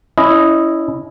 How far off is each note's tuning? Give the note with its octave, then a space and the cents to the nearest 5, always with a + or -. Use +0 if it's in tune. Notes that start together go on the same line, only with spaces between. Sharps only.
C#4 +30 E4 +0 D#5 +0